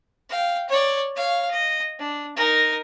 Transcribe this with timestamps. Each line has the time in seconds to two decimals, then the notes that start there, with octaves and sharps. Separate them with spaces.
0.29 F5 G5
0.69 C#5 D5
1.16 C#5 F5
1.50 D#5
1.99 D4
2.36 D#4 A#4